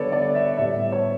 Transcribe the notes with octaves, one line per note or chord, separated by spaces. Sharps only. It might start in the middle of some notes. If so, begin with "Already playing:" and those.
Already playing: D3 G3 B3 A4 B4 C#5 D5
D5
E5
A2 G3 B3 E5
C#5